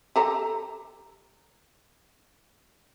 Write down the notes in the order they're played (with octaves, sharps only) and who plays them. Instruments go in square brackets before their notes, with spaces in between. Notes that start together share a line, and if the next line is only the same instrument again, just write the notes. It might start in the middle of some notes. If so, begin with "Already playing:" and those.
[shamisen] G4 A4 A#5